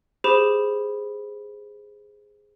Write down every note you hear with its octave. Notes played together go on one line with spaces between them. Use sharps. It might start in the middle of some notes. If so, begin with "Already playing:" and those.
G4 G#4 C5 B5 E7